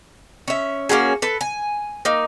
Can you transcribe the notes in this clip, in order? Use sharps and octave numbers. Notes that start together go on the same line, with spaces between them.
C#4 E5
A#3 C#4 F#4 G#4
A4 B4
G#5
A#3 D#4